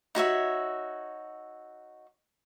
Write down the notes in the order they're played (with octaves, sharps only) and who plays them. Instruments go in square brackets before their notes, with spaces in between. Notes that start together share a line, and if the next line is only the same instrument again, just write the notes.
[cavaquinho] D#4 F#4 C#5 E5